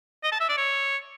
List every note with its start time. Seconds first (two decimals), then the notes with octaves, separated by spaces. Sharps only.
0.23 D#5
0.32 A5
0.40 E5
0.49 D5
0.57 C#5